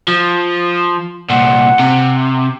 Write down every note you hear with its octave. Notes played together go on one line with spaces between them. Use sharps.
F3
C2 A#2 F#5
C3